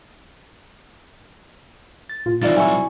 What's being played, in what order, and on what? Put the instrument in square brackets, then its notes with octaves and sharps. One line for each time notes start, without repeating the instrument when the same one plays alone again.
[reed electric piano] A6
[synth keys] A#2 F4
[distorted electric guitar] C2 [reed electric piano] E3 F5 A6 [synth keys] D#4 F4 D5
[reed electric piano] F#3 E4 C#6 [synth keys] G#5